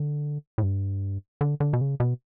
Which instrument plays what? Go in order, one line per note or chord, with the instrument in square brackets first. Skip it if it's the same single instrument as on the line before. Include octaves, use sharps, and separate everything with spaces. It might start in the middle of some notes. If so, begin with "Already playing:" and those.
Already playing: [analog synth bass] D3
A2
G2
D3
D3
B2
C#3
B2